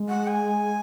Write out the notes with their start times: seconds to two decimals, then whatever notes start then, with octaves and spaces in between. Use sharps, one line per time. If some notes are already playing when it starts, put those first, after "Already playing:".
Already playing: G#3
0.09 F#5
0.27 G#5